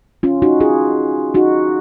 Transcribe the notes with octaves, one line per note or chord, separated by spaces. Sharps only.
C#4 F4
D#4 F#4
F4 G#4
D#4 F#4